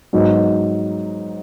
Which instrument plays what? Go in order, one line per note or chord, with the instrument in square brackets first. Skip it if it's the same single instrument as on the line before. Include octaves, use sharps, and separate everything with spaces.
[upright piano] G#2 F#3 B3 D#4